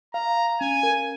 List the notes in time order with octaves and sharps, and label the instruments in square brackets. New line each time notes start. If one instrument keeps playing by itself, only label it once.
[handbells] F5 [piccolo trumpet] A#5
[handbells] F5
[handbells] C#4 [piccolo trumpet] G#5
[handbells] A#4